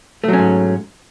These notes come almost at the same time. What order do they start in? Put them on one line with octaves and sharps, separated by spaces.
A3 F#3 C#4 G#2